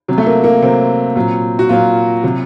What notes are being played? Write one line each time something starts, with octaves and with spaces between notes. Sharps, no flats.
C3 F#3
A3
A#3
A#3
C3 F#3 C4
A#2 F#3
F#4
A#2 F#3 F4
C3 F#3